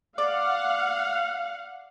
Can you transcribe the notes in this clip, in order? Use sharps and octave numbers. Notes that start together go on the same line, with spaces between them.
D5 F5 F#5